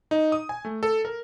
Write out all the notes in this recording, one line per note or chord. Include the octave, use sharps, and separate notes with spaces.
D#4
D#6
G#5
A3
A4
A#4